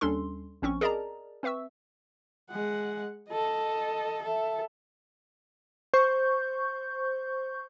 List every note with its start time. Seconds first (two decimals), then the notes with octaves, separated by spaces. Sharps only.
0.01 D#2 G3 C#4 D4 A4 C6
0.62 A#1 C4 C#4 C#6
0.81 G#4 A#4 D5 D#5 A5 A#5
1.43 C4 B4 E5 C#6 E6
2.50 G#3 F#5
3.30 A4 D#5
4.22 A4 E5
5.94 C5 C#6 G6